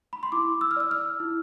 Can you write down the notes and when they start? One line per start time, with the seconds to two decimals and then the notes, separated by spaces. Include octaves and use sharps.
0.13 B5
0.23 C6
0.32 E4 D6
0.61 E6
0.71 F6
0.76 D5 E6
0.91 F6
1.20 E4